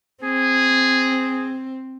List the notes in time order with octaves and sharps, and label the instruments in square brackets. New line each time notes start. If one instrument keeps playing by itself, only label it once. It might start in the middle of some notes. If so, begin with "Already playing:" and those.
[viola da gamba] C4 [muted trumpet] G#4